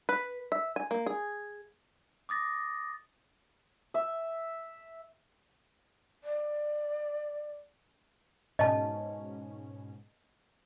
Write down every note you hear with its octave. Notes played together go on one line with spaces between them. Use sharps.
B4
E5
G#5
A#3
G#4
D6 D#6 A6 A#6
E5
D5
G#2 B2 C#4 D#5 A5